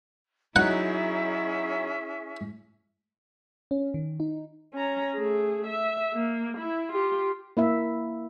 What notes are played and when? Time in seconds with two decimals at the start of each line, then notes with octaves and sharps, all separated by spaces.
0.56 F#3 C#4 D#4 E4 G#4 E5 F#5
3.71 C#4
3.94 D#3
4.20 D#4
4.74 C#4 A#5
5.14 A3 G#4
5.66 E5
6.14 A#3
6.58 E4
6.92 F4 G4
7.57 A#3 E4 E5